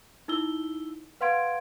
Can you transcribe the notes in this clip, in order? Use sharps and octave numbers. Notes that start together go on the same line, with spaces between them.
D#4 E4 E6 G7
B4 F5 F#5 C6 G#6 D7